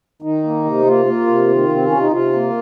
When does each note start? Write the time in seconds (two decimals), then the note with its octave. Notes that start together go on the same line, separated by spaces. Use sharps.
0.22 D#3 D#4
0.43 A#3
0.64 C3
0.85 A#3 F4
1.06 A#3
1.27 C3
1.48 D#3
1.69 C3 C4
1.86 C#4
1.91 C3
1.99 D#4
2.11 C3 F4
2.33 A#3